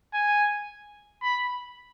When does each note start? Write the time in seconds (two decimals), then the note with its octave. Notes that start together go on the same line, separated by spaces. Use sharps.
0.13 G#5
1.22 B5